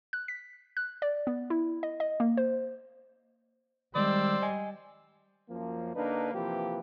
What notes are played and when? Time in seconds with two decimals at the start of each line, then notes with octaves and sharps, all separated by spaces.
0.13 F#6
0.28 B6
0.77 F#6
1.02 D5
1.27 B3
1.50 E4
1.83 D#5
2.00 D#5
2.20 A#3
2.37 C5
3.95 D#3 G3 G#3 C5 D5 E6
4.42 D#5 G#5
5.49 F#2 F3 A#3
5.94 D3 A#3 D4 D#4 B4
6.33 C3 E3 F3 A#3 G4 B4